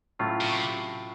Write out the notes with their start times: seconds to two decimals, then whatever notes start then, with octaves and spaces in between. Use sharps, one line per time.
0.19 A2 F#3 A3 C#4 F4
0.41 C3